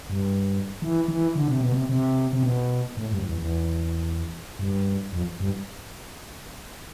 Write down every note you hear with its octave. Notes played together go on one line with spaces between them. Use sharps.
G2
E3
E3
D3
C3
B2
C3
C3
C3
B2
A2
G2
F2
E2
E2
G2
F2
G2